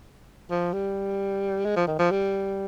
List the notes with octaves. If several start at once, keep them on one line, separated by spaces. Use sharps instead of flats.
F3
G3
G#3
F3
D#3
F3
G3